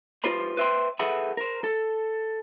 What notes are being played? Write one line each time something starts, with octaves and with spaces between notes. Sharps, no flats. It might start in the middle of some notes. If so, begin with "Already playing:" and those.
F4 G4 B4 C5 B5
B4 C5 E5 F5 G5 C6
G#4 A4 B4 E5 F#5 B5
A#4 C5
A4